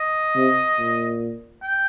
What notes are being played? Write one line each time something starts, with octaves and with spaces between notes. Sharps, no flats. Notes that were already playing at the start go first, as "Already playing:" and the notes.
Already playing: D#5
C3
A#2
G5